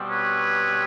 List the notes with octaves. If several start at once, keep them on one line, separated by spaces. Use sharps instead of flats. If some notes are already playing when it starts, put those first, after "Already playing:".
Already playing: B2 G3 C4
B4 C#5